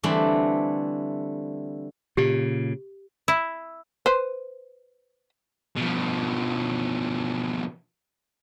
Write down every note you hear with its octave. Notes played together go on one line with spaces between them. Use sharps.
D3 E3 G3 A3 C4
A#2 C#3 G4
E4
B4 C5
B2 F3